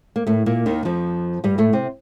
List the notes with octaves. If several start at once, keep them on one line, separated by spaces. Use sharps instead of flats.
A#3
A2 A3
A#2 A#3
D#2 D#3
F2 F3
G2 G3
A2 A3
C3 C4